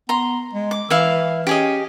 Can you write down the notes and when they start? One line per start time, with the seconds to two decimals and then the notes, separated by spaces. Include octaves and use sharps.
0.09 B3 A#5 C6
0.53 G#3
0.71 D6
0.90 E3 E4 E5 F5
1.47 C#4 G4 G#4 D#5